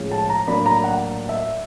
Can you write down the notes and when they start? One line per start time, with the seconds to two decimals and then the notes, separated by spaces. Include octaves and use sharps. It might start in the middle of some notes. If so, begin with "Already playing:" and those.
Already playing: A2 F3 G#3 C#4
0.12 A5
0.29 A#5
0.47 A2 F#3 A#3 D4 B5
0.66 A#5
0.84 F#5
1.29 E5